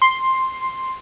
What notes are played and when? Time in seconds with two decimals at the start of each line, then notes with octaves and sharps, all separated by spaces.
0.02 C6